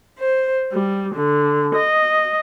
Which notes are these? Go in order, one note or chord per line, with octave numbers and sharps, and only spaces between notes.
C5
G3
D3
D#5